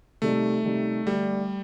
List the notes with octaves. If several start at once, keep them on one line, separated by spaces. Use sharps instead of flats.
C3 D#3 G3 A3
C3 D#3 G3
D3 G3 A3 D4 G4